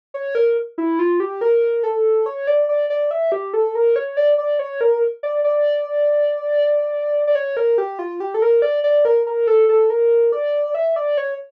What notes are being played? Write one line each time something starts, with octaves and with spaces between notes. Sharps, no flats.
C#5
A#4
E4
F4
G4
A#4
A4
C#5
D5
D5
D5
E5
G4
A4
A#4
C#5
D5
D5
C#5
A#4
D5
D5
D5
C#5
A#4
G4
F4
G4
A4
A#4
D5
D5
A#4
A#4
A4
A4
A#4
D5
E5
D5
C#5